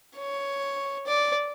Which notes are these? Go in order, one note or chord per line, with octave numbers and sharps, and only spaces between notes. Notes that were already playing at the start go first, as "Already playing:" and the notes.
C#5
D5